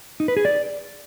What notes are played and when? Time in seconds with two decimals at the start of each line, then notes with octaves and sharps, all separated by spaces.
0.20 D#4
0.28 B4
0.37 G#4
0.45 D5